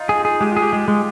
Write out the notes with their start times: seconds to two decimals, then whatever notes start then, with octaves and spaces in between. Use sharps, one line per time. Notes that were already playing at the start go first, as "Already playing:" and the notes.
Already playing: D#4 F4
0.09 G#4
0.25 G#4
0.40 G#3 G4
0.51 F4
0.57 G#4
0.62 G4
0.73 G#3
0.88 G#3